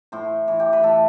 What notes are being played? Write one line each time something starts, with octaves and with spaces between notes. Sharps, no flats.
A2 C5
E3
G4
B4
A2 A4